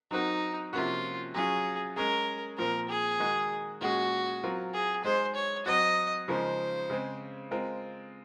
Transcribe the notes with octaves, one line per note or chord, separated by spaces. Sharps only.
F#3 C4 D#4 F#4 A#4
C3 F3 A#3 C#4 F4 F#4
F#3 C#4 F4 G#4
G#3 C#4 G#4 A#4
A#2 F3 C4 A#4
G#4
D#3 G#3 D#4 F#4 A#4
A#2 G#3 C#4 F#4 G#4
F#3 C4 F4 A#4
G#4
G#3 D#4 G#4 C5
C#5
F#3 C4 F#4 D#5
C#3 F3 G#3 D#4 A#4 C5
C#3 G#3 C4
G#3 C4 F4 A#4